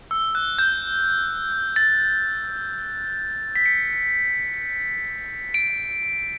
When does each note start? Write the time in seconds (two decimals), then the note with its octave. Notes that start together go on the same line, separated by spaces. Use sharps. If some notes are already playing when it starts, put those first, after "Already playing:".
0.11 E6
0.35 F#6
0.59 G6
1.76 A6
3.56 B6
3.66 C#7
5.54 D7